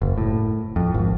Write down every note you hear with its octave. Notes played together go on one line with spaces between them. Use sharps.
F#1
A2
F2
G#1